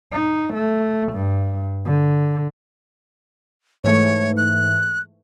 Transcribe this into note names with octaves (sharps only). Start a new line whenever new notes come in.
D#4
A3
G2
D3
G#2 E3 A3 C#5
F#6